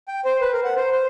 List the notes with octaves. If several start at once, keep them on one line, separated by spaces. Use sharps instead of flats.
G5
C5
B4
A#4
F#5
C5
C5